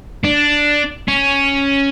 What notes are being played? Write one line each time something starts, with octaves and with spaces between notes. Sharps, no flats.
D4
C#4